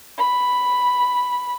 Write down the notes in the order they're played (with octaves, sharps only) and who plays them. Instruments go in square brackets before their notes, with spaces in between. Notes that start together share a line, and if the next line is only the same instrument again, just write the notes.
[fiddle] B5